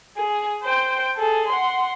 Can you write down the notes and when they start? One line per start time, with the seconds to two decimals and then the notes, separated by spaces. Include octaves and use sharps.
0.17 G#4
0.63 C5 G5
1.17 G#4 A4
1.48 F#5 C6